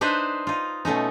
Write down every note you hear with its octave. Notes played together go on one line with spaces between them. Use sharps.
D4 D#4 B4 C5 E5
D#4 F4
B2 A3 C#4 D#4